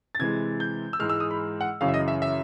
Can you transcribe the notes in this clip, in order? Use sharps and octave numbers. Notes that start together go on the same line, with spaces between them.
A6
C3 E3 G#3 G#6
G6
E6
G#2 E3 G#3 F6
E6
D#6
B5
F#5
F#2 C#3 E3 F5
E5
D#5
E5
E5